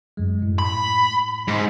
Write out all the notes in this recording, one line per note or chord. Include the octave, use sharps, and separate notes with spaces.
F#2 G#3
A2
B5
G#2